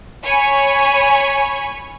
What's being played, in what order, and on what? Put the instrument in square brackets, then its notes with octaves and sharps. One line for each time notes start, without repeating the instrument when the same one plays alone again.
[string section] C#5 G#5 B5 C#6